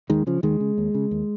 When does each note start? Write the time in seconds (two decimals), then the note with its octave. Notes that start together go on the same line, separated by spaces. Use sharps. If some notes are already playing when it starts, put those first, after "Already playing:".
0.10 D#2 D#3 G#3
0.27 C#3 F3
0.43 D#2 D#3 G#3
0.60 C#3
0.78 D#2
0.95 C#3
1.11 D#2